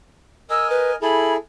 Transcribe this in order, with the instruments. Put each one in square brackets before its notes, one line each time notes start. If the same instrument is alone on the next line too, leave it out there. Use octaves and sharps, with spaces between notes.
[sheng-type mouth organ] A#4 D#5 G#5 [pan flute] E6
[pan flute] B4
[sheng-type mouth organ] E4 G#4 A4 [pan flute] B5